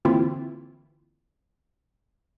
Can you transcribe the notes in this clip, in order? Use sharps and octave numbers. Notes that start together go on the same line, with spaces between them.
D3 E3 A#3 C4 E4 F4